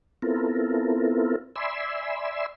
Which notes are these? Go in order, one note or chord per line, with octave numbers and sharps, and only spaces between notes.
B3 C4 E4 F4 A4 A#4
D5 E5 G#5 B5 C6 E6